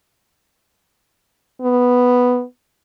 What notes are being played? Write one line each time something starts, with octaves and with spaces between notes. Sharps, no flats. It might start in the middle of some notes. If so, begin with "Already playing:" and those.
B3